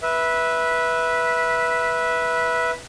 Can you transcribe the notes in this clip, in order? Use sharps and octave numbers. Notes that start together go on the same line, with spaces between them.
B4 E5